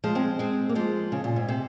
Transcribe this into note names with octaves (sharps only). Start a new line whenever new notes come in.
F3 G#3
G#3 C4
G#3 C4
A#3
F3 G#3
C#3
A#2
G#2
C3